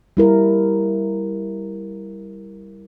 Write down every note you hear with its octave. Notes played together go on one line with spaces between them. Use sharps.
G3 E4 A#4